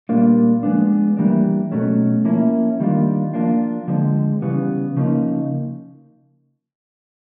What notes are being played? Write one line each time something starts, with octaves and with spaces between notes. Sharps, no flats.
A#2 G3 A#3 D4 F4
F3 G#3 B3 D4
E3 G3 A#3 D4
B2 F#3 A3 C#4
F3 A#3 C#4 E4
D#3 G3 A#3 D4 F4
F3 A#3 D4 F4
D3 F3 G#3 C4
C#3 E3 G3 B3
C#3 F3 A#3 D#4